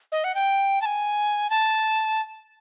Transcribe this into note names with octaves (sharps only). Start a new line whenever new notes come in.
D#5
F#5
G5
A5
G#5
A5